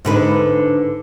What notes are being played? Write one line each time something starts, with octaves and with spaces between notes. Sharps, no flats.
G#2 D3 B4